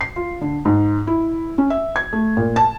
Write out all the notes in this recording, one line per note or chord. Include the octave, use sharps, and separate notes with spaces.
C7
F4
D3
G#2
E4
C#4
E5
G#6
A3
A#2
A5